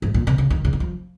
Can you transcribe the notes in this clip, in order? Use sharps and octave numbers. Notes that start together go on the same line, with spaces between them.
G#2
A#2
C3
C#3
D#3
C#3
D#3
F3